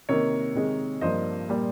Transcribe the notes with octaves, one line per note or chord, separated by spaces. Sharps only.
C3 D#3 A#3 A#4 C#5
C3 D#3 G#3
G2 F3 A#3 C5 D#5
A#2 G3 A#3